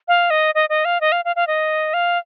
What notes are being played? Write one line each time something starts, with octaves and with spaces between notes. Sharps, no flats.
F5
D#5
D#5
D#5
F5
D#5
F5
F5
F5
D#5
F5